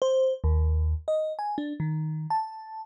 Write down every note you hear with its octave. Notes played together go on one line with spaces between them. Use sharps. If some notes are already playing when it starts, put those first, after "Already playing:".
C5
D#2
D#5
G#5
D4
D#3
A5